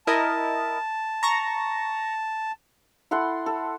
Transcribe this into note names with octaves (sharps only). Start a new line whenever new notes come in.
E4 A#4 D#5 A5
A#5 C#6 A#6
E4 A4 F#5 C6
A4